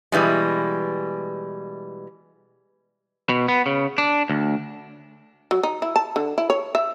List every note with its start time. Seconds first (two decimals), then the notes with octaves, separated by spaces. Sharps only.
0.12 B2 E3 G3 G#3
3.29 B2
3.48 B3
3.66 C#3
3.98 D4
4.30 D2
5.51 F#3
5.63 D#4
5.82 E4
5.96 A5
6.16 D3
6.38 E4
6.50 C#5
6.75 E5